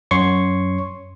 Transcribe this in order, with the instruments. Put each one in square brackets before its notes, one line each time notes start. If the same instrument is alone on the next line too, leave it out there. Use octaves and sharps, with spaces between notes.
[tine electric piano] F#2 C#5 C6 C#6